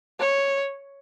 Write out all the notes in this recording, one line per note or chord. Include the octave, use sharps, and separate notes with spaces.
C#5